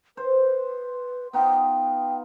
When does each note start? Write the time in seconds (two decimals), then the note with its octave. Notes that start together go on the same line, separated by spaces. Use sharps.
0.17 B4 C5
1.33 B3 D#4 F4 G5